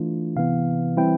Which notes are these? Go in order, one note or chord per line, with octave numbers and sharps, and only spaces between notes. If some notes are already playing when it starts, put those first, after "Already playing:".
Already playing: E3 A3 D4 F4
C3 E3 B3 F5
E3 G3 C4 E4 G5